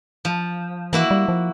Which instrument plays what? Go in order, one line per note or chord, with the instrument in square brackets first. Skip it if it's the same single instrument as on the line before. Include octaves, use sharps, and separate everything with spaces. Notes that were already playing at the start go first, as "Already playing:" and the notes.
[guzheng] F3
[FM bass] E3 [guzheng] A#3 E4 F#4
[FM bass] G3
F3